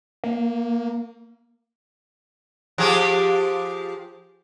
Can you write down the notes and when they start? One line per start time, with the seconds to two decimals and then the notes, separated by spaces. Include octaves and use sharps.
0.24 A#3
2.78 F3 G4 G#4